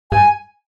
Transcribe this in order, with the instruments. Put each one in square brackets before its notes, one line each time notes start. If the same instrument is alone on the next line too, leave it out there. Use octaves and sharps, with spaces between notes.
[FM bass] G2 [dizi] G#5